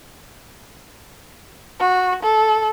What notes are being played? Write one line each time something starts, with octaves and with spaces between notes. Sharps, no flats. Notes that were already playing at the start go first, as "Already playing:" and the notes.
F#4
A4